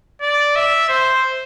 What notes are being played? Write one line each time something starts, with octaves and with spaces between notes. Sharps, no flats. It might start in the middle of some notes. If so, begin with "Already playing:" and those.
D5
E5
C5